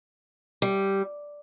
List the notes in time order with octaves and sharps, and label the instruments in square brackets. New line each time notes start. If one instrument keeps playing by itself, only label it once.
[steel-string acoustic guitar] G3